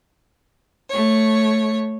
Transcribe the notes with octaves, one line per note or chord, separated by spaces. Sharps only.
A3 C#5